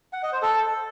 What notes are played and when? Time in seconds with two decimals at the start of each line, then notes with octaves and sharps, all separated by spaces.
0.13 F#5
0.23 D#5
0.32 C5
0.42 A4